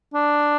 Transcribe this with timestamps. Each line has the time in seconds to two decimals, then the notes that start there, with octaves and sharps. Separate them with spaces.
0.14 D4